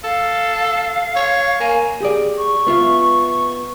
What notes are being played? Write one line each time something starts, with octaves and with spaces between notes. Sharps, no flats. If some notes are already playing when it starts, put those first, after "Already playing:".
A4 F5
C#5
A#3 G#5
G4 G#4 D5
C#6
B3 F4 E5